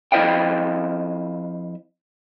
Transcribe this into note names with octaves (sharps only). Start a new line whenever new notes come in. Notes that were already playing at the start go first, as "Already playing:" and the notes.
F2 E4 C5 D#5 F5 G5